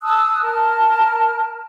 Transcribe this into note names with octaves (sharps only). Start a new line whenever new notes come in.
A5 D#6 E6 F#6
A#4 A5 F6